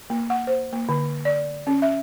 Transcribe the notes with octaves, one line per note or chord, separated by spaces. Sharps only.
A#3
F#5
C5
A#3
D3
D5
C#4
E5